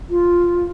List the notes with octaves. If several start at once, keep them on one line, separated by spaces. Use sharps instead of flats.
F4